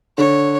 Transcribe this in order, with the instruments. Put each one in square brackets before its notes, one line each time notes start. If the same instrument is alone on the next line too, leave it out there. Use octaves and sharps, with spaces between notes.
[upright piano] D3 [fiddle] C#5